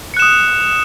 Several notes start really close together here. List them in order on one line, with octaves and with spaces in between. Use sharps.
C#7 F#6 E7 D#6